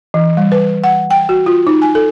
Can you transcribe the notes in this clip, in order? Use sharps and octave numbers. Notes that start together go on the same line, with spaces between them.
E3
G3
B4
F#5
G5
F#4
F4
D#4
G#5
A4